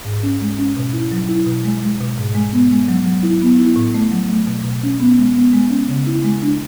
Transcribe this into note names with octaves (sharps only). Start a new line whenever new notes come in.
G#2
C#4
G#3
C#4
B2
E4
F#3
E4
B2
G#3
G#3
B2
G#2
G#3
B3
G#3
F#3
F#3
E4
B3
E4
A2
A3
F#3
A3
B2
B2
C#4
B3
G#3
B3
G#3
C#4
C#3
E4
G#3
D4